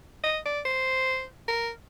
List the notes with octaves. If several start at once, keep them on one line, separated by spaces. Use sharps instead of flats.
D#5
D5
C5
A#4